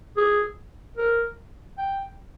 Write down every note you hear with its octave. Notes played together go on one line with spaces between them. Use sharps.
G#4
A#4
G5